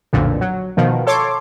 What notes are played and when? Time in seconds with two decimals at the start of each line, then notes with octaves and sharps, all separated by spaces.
0.13 B1 F2 A#2 D3
0.41 F#3
0.77 B2 D#3 F3
1.07 A4 C#5 C6 D6